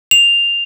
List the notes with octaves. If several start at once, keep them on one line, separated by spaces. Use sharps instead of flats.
F7